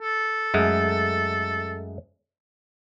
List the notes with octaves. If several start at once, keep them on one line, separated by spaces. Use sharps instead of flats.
A4
F#2 G#3 A3